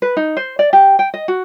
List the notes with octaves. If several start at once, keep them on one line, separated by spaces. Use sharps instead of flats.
B4
D#4
C5
D5
G4
G5
D#5
F#4